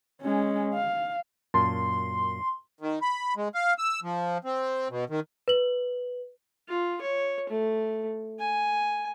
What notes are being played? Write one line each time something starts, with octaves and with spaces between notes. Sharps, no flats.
G#3 C#4
F5
F#2 A#2 A5 C6
D#3
B5
G#3
F5
E6
F3
C4
B2
D#3
B4 F#7
F4
C#5
A3
G#5